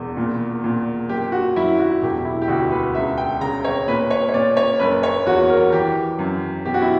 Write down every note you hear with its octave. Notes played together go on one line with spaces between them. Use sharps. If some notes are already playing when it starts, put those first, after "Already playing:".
Already playing: E1 E2
A#2
A#2
F#1 G4
F#4
F#2 E4
F#4
E1 G4
E4
G4
D2 F#4
B4
C#2 E5
G5
C#3 A#5
C#5
A#2 B4
C#5
C#5
A#2 D5
C#5
F#1 B4
C#5
E2 F#4
A#4
E3 G4
F#2
B2 G4
F#4
E4